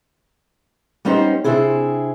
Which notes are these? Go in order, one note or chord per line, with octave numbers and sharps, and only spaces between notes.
G3 B3 C#4 D#4 G4 C5
C3 C4 D4 E4 G#4